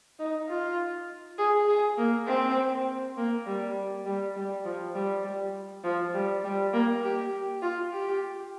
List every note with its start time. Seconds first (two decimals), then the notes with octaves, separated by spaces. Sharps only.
0.19 D#4
0.48 F4
1.38 G#4
1.68 G#4
1.98 A#3
2.27 C4
3.17 A#3
3.46 G3
4.06 G3
4.36 G3
4.65 F3
4.95 G3
5.25 G3
5.84 F3
6.14 G3
6.44 G3
6.73 A#3
7.03 G4
7.62 F4
7.93 G4